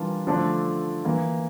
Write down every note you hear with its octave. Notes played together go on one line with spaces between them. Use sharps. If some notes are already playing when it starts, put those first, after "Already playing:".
Already playing: E3 G3 D4 F4 A#4
D3 F3 A3 D4 F4
E3 A#3 E4